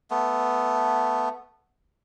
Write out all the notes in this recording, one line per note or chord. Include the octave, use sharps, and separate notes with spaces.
A3 B3